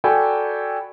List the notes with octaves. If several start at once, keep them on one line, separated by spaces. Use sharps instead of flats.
F#4 A4 D5 G5 G#5 B5